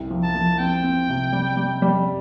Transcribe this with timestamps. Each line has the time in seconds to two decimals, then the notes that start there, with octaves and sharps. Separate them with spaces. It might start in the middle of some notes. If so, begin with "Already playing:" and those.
Already playing: C2
0.10 F3
0.24 A5
0.35 F3
0.59 C4 G5
0.83 C4
1.09 C3
1.33 G3
1.57 G3
1.82 G3